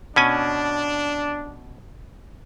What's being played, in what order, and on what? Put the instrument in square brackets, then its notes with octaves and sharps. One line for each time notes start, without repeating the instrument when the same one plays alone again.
[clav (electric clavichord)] B2 C#4 G#5 [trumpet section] D4